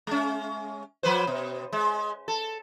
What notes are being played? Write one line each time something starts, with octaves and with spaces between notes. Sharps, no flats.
G#3 C#4
F3 B4 C5
B2
G#3
A4